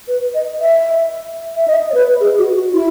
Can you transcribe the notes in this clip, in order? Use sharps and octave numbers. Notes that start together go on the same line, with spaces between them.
B4
D#5
E5
E5
D#5
C#5
B4
G#4
F#4
F#4
E4